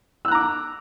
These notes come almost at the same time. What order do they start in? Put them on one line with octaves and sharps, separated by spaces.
E6 F#6 A#5 D6